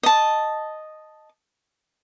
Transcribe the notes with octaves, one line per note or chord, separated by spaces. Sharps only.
D#5 A5